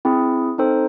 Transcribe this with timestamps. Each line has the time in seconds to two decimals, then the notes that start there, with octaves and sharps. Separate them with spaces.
0.05 C4 E4 G#4
0.58 C4 D#4 A4 C5